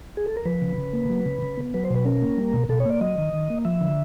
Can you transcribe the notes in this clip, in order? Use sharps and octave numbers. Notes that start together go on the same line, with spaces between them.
G#4
A4
A#4
F3 B4
C#3
C#3
A#3
F#3
C#3
C#3
B3
F#3 B4
C5
B2
B4
C#4 A#4
A#3
G3
B2
B2 A4
C#5
A#3 D5
F#3 D#5
D#3
D#3
A#3
F3 E5
D3